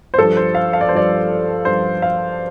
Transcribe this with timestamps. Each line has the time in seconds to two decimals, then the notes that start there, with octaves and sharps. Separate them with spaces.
0.14 C5
0.18 G2 F3 A4
0.37 C5
0.55 F5
0.73 F5
0.81 D5
0.89 C5
0.92 G2 F3 D5
1.65 G2 F3 C5
2.02 F5